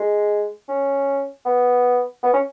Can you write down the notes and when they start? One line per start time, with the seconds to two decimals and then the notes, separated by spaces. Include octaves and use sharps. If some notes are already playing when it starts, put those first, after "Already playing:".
Already playing: G#3
0.68 C#4
1.45 B3
2.23 B3
2.33 C#4